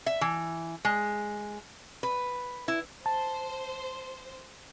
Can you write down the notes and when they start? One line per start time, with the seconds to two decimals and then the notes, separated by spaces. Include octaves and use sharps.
0.06 E5
0.21 E3
0.85 G#3
2.03 B4
2.68 E4
3.06 C5 A5